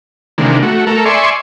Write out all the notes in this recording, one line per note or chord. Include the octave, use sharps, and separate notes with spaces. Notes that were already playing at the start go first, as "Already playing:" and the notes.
C3 D#3 E3 G#3 A#3 D4
A3 F#4
A3 A4 A#4
D5 E5 G#5 C6 C#6